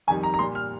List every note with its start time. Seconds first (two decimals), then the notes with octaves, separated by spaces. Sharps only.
0.07 F2 D#3 G3 G#5
0.23 A#5
0.34 A#5
0.39 A#2 G3 C6
0.55 F6